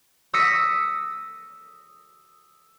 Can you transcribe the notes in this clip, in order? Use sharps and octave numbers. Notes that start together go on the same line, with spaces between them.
D#6 E6 A#6 B6 C#7